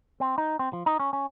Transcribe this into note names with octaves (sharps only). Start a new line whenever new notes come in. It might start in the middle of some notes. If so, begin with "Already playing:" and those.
C4
D#4
C4
F3
D#4
C#4
C#4